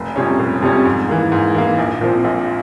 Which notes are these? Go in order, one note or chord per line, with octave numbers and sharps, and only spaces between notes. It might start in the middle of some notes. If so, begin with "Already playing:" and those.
Already playing: F1
F2 C3 G3 C#4
F1
F2 C3 G3 C#4
G#2
E3 A#3
G#2
E3 A#3
A#1
A#2 F3 C4
A#1